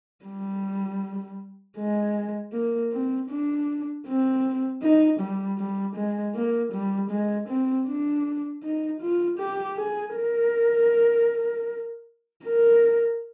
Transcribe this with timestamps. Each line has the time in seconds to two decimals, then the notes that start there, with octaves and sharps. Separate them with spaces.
0.25 G3
1.78 G#3
2.53 A#3
2.92 C4
3.30 D4
4.07 C4
4.83 D#4
5.20 G3
5.59 G3
5.96 G#3
6.35 A#3
6.73 G3
7.10 G#3
7.48 C4
7.87 D4
8.63 D#4
9.01 F4
9.39 G4
9.78 G#4
10.15 A#4
12.45 A#4